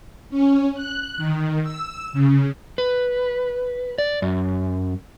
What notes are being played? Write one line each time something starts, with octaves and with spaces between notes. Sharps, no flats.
C#4
F#6
D#3
E6
C#3
B4
D5
F#2